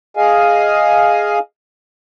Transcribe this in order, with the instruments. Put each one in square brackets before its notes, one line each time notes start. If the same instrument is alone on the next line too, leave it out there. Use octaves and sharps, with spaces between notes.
[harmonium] G#4 D#5 F5 G#5